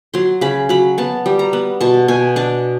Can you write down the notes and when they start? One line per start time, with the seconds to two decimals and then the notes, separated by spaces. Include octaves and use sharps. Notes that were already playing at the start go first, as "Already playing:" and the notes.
0.14 F#3 C6
0.41 C#3 B5
0.69 F#3 B5
0.98 B3 A5
1.26 G3
1.39 A#5
1.53 B3
1.81 B2 A5
2.08 B2 G#5
2.36 D4 A5